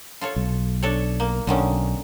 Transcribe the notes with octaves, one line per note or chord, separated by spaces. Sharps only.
F4 A4 C#5
B1
D4 A4 C#5
A#3
B1 D3 D#3 C#4